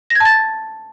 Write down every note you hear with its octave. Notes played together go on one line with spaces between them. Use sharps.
A#6
G#6
A5
A6